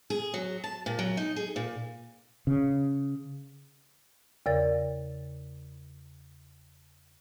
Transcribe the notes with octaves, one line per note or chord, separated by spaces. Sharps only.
G#4
F#3
A5
A#2
F#3
D#4
G#4
A#2
C#3
E2 C#3 A#4 D5 F5 A6